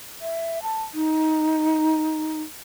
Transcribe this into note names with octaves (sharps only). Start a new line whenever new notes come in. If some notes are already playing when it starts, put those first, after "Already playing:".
E5
A5
D#4